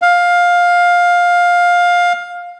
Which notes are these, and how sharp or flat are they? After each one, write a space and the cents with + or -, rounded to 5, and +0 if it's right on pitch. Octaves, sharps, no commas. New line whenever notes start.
F5 +15